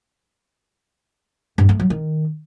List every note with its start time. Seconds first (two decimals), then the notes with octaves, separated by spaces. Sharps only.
1.58 G2
1.69 A3
1.80 F#3
1.90 D#3